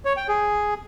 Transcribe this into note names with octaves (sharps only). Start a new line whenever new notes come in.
C#5
G5
G#4